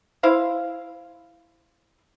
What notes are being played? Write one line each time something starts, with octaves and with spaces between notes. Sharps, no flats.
E4 C5 F5